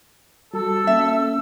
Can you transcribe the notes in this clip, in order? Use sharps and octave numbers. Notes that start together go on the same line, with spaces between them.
G3 F#4 A4 E6
A#3 C#4 E5